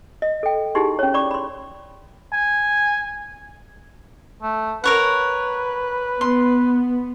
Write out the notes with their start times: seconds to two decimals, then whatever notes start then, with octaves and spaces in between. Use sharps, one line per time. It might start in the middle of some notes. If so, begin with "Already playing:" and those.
0.22 D#5
0.43 A4 G5
0.75 D#4 E4 G4 G#4 C6
0.99 C#4 C#5
1.14 D5 B5 C#6 D6
1.31 B5 C6
2.33 G#5
4.42 A3
4.84 A#4 B4 C#5 F#5
6.21 B3 C6